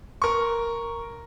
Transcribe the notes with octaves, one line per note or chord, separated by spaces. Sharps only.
A#4 C#6